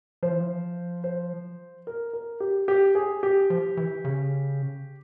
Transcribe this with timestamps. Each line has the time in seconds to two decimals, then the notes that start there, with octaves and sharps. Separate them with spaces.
0.23 F3 C5
0.31 E3
0.40 F3
1.04 C5
1.87 A#4
2.13 A#4
2.40 G4
2.68 G4
2.95 G#4
3.23 G4
3.50 F3
3.77 E3
4.05 C#3